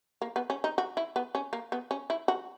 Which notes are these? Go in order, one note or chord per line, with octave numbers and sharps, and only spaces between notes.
A#3
B3
C#4
D#4
F#4
E4
B3
C#4
A#3
B3
C#4
E4
F#4